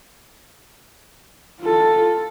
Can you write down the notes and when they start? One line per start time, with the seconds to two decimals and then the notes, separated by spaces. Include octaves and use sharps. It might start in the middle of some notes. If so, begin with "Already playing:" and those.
1.60 F4 A4